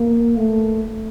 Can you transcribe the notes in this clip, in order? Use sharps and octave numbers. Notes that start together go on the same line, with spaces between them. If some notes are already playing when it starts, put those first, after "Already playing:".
Already playing: A#3
A3